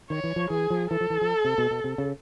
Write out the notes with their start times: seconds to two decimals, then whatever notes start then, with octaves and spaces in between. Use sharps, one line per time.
0.10 D#3 C#5
0.24 E3
0.36 F3
0.50 E3 G#4
0.70 F3
0.91 E3 A4
1.01 F3
1.10 E3
1.21 F3
1.45 C3
1.58 B2
1.71 B2
1.84 C3
1.98 C#3